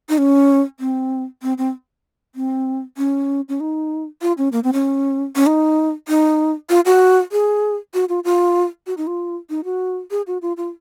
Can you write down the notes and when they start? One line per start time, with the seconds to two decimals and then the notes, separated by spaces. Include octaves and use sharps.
0.09 D#4
0.18 C#4
0.80 C4
1.43 C4
1.58 C4
2.35 C4
2.97 C#4
3.49 C#4
3.60 D#4
4.22 F4
4.38 C#4
4.52 A#3
4.64 C4
4.73 C#4
5.36 C#4
5.46 D#4
6.08 D#4
6.70 F4
6.86 F#4
7.32 G#4
7.94 F#4
8.09 F4
8.24 F4
8.87 F#4
8.97 D#4
9.07 F4
9.50 D#4
9.64 F#4
10.11 G#4
10.27 F#4
10.42 F4
10.57 F4